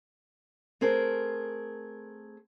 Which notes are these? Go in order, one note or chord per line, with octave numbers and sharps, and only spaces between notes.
A3 C4 G#4 A#4